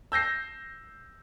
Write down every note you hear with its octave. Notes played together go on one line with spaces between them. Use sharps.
E6 G6 A#6 C7